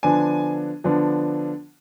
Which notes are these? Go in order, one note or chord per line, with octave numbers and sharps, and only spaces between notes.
D3 F3 B3 D4 G#5
D3 F3 B3 D4